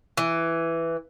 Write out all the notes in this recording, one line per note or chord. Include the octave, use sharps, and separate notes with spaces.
E3